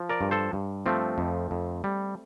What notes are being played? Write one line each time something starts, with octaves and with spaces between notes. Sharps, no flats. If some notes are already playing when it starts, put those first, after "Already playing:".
Already playing: F3
A#4 D5
G2
A4 C5
G2
F3 A3 C4
F2
F2
G3